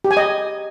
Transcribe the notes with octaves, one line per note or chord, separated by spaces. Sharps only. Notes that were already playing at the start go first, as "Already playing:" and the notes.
G4
G#5
D#5